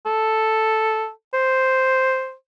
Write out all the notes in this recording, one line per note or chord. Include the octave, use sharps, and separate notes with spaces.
A4
C5